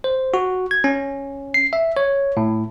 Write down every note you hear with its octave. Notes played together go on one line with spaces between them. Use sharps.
C5
F#4
G#6
C#4
C7
E5
C#5
A2